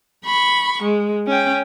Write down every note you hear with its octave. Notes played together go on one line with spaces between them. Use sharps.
B5 C#6
G#3
C#4 G5